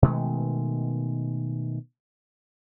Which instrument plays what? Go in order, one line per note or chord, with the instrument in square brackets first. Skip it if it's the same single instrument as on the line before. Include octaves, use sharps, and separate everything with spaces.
[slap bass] B2 D#3 G#3 A3